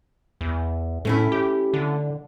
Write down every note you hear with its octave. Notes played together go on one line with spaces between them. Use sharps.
E2
A2 A3 C#4 E4
G4
D3